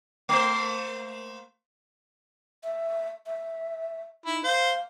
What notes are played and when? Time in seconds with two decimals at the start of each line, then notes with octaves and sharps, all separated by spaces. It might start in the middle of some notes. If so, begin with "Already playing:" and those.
0.29 A3 A#3 C5
2.64 E5
3.26 E5
4.26 D#4 E4
4.44 C5 F5